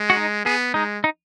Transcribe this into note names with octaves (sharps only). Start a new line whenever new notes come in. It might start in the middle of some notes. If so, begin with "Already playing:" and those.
Already playing: G#3
F#4
D#4
B3 G#4
G#3 D#4
D#4